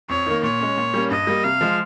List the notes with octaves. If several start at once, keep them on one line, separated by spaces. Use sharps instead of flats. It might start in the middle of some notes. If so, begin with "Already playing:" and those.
F2 C#5
D#3 A#3
A#2 C#5
G#3 C#4
A#2
G3 A#3 C#4
G2 D#5
G3 A#3
C3 F5
F3 G#3